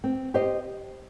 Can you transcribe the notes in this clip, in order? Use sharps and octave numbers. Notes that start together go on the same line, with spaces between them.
C4
G4 C5 D#5